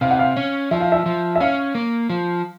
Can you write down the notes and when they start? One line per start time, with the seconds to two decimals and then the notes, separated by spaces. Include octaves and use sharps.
0.01 C3 F5
0.11 F#5
0.19 F5
0.36 C#4
0.71 F3 E5
0.81 F5
0.92 E5
1.06 F3
1.36 E5
1.40 C#4 F5
1.75 A#3
2.10 F3